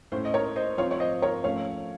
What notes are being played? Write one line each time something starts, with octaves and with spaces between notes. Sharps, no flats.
A2 A3 C#4 C5
D#5
A#4 C#5
C5 D#5
F3 C4 F4 C#5 F5
C#5
C5 D#5
A#4 C#5
F3 A3 C#4 C#5 F5